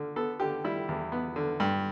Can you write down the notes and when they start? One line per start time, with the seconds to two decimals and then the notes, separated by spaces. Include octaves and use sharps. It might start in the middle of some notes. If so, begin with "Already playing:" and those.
Already playing: D3
0.16 B3 A4
0.40 D3 G4
0.65 G3 E4
0.89 E2
1.12 B3
1.36 D3
1.60 G2